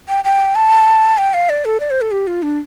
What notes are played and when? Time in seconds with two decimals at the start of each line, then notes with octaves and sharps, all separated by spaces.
0.09 G5
0.24 G5
0.55 A5
1.18 G5
1.34 F5
1.49 D5
1.65 A4
1.80 D5
1.90 C5
2.01 A4
2.11 G4
2.27 F4
2.43 D4